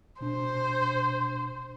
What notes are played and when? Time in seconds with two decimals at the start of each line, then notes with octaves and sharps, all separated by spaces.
0.21 B2 D4 C5